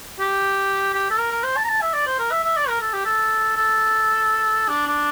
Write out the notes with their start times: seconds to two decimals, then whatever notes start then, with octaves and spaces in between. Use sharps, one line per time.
0.19 G4
0.94 G4
1.11 A4
1.19 A#4
1.32 A#4
1.44 C5
1.57 A5
1.64 A#5
1.69 A5
1.82 E5
1.94 D5
2.07 C5
2.19 A#4
2.31 E5
2.44 E5
2.57 D5
2.68 A#4
2.81 A4
2.93 G4
3.05 A4
3.57 A4
4.68 D4
4.87 D4